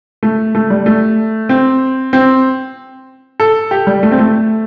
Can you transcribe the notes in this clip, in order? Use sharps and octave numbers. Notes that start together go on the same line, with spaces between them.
A3
A3
G3
A3
C4
C4
A4
G4
G3
A3
C4
A3